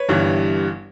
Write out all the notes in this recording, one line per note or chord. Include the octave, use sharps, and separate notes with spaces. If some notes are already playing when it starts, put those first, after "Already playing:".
Already playing: B4 C#5
G1 G2 E3 G3